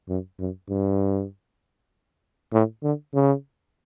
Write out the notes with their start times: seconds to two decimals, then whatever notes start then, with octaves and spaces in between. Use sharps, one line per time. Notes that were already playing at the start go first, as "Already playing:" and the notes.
0.09 F#2
0.40 F#2
0.70 G2
2.53 A2
2.83 D3
3.14 C#3